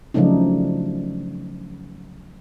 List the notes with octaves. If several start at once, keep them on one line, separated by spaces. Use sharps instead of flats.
C#3 F3 F#3 A3 D4 D#4